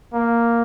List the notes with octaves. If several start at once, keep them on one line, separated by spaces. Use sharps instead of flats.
A#3